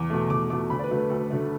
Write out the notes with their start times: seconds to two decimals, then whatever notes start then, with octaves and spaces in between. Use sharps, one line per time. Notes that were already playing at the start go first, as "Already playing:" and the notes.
Already playing: E2 D6
0.10 B2 A3
0.30 E2 D6
0.50 B2 A3 D6
0.70 D2 B5
0.79 D5
0.84 B4
0.90 D3 F#3 A3
0.97 B4
1.10 D2 A4
1.30 D3 F#3 A3